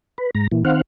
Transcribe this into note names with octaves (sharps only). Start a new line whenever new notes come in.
B4
G#2 A#5
A#2 E3
D#3 C4 F5 F#5